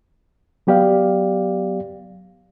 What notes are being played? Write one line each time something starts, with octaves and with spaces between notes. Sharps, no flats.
F#3 B3 G4 D5 F5